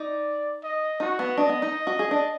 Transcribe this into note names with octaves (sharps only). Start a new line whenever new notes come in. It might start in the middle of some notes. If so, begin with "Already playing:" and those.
Already playing: D#4 D5
D#5
D#4 F#4
B3
D4 D#5
B3
D#4
F#4
G#4
D4